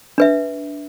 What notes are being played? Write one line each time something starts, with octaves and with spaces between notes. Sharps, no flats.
D4 B4 E5